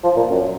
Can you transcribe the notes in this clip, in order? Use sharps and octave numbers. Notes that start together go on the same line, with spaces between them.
F3
A#2
F#2